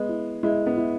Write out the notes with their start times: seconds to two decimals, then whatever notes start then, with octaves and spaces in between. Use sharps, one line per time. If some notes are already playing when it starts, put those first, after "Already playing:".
Already playing: G#3 B3
0.09 E4
0.43 G#3 E4
0.66 B3
0.77 E4